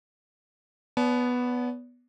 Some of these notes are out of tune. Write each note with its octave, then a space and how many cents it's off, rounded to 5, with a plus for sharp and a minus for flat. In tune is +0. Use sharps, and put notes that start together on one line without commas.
B3 +0 D5 -45 A5 -40